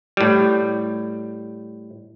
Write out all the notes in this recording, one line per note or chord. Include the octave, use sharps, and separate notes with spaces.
A2 G3